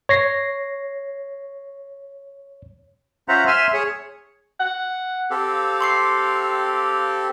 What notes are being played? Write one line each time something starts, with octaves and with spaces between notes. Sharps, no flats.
C#5 A#6 C7
C#4 F4 C5 E5 F#5 A#5
E5 G#5 C6 E6 F6
G#4 C#5
F#5
C4 G4 A4 F5
C6 C#6 C7